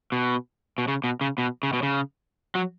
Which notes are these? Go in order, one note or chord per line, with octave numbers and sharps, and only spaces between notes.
B2
B2
C#3
B2
C#3
B2
C#3
B2
C#3
F#3